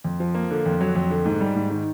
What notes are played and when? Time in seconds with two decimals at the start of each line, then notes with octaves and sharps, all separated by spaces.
0.04 F2
0.20 F3
0.35 A#3
0.51 D3
0.66 F2
0.81 F#3
0.96 F2
1.10 D3
1.25 G#2
1.41 G3
1.55 G#2
1.70 D#3